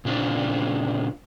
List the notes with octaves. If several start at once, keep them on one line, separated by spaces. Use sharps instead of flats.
A#2 C#3 C4 D4 F4